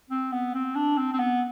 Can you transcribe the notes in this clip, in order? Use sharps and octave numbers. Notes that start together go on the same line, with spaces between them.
C4
B3
C4
D4
C4
C4
B3